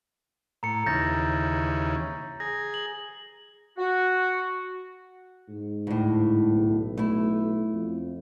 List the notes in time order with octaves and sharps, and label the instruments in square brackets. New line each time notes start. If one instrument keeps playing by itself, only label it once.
[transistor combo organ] A2 [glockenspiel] A#5 C#7
[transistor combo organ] D#2 C#3 E3 [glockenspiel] G6 A6 A#6
[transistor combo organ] G#4 [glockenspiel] A#6
[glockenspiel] F#7
[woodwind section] F#4
[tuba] G#2
[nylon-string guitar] D2 A2
[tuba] B1
[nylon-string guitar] A3 E4
[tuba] F2